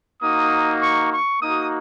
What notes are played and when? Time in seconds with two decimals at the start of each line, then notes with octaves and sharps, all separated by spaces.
0.21 A#3 D#4 F#4 D#6
0.82 C#6
1.11 C#6
1.41 A#3 D#4 F#4 D#6